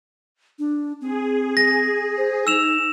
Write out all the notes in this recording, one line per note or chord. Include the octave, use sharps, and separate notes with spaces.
D4
C4 G#4
A#6
C5
D#4 E6 E7 F7